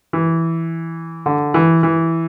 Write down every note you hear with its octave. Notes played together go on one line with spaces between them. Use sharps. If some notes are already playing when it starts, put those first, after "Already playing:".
E3
D3
E3
E3